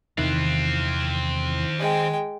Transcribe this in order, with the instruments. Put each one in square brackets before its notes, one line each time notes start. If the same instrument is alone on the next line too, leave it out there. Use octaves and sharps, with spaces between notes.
[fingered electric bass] E2 C3 [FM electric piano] D#3 E4 F#6 [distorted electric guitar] C4 F4
[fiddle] G#3 G5